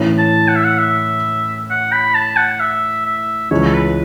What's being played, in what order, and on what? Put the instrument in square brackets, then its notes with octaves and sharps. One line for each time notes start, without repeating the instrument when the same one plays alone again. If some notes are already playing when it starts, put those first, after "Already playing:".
Already playing: [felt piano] A2 E3 C#4 E4
[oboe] A5
F#5
E5
F#5
E5
F#5
B5
A5
F#5
E5
E5
[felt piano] C#2 C#3 E3 [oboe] C#5
[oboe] A4
B4